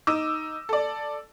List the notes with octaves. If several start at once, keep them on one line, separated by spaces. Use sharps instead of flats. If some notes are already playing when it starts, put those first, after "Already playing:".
D#4 D6 E6
A4 D5